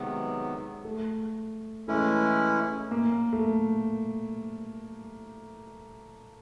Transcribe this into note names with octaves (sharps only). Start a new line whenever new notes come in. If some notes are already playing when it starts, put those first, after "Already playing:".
Already playing: C3 D#3 F#3 G#3 B3
A3
E3 G#3 A3 C#4 E4
A#3
A3